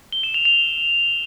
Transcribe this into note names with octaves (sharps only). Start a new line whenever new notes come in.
G7
E7
F7
F7